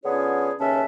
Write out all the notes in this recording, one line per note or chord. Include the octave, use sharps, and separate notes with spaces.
D3 B3 C#4 F4 G#4 C#5
D#2 C#3 C#4 B4 E5 A5